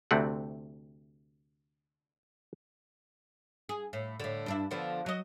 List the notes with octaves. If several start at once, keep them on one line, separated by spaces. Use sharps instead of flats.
D2 C3 A3 C4 F#5
G#4
A2
A2 D3
G2 D4 E4
D3 F3 B3
F#3 D#5